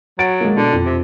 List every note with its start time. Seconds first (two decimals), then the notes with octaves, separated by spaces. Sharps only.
0.19 F#3 F#5 A6 D7
0.41 G#3 A#3
0.56 B2 D3
0.73 F2
0.86 C3